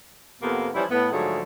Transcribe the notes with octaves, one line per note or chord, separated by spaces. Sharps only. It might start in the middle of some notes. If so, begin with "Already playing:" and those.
F2 C3 A#3 B3
E3 F3 G3 C#4 E4
A2 B3
G#2 D3 F3 F#3 A3 G#4